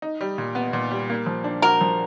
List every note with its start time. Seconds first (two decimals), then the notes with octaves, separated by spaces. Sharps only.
0.02 D#4
0.21 G3
0.38 A#2
0.55 B3
0.73 A#2
0.91 G3
1.10 A#3
1.26 F3
1.44 D4
1.62 F#4 A#4
1.81 F3